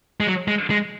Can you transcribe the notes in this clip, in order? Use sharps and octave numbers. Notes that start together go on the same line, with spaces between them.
G#3
F#3
G#3
G#3